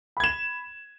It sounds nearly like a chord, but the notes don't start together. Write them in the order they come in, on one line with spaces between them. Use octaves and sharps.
B5 G#6 E7